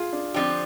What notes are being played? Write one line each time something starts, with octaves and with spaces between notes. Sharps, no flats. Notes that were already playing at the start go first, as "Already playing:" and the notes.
Already playing: F4 G#4
D4
D3 F3 C4 D4 G4